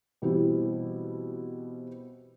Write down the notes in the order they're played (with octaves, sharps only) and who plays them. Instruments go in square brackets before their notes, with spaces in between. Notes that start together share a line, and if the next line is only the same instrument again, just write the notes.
[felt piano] B2 E3 G3 C4 E4